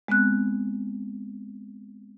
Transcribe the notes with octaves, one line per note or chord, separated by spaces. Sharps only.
G#3 B3 C4 F#6